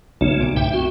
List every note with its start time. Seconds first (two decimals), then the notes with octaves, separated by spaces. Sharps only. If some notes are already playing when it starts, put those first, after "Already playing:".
0.21 B1 C#3 A3
0.40 C2 A#2 D7
0.56 G2 E5 G5
0.73 C4 F#4